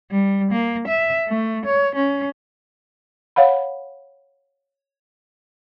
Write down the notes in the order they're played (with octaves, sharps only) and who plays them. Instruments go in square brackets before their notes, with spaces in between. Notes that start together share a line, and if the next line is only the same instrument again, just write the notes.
[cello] G3
A#3
E5
A3
C#5
C#4
[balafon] C#5 F5 F#5 B5